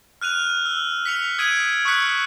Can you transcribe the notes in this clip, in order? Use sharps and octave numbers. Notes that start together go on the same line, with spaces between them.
F6 F#6 D#7 F7
E6
B6 C#7 F7
D#6 G#6 B6 D7 D#7
C#6 D#6 E6 F#6 B6 C#7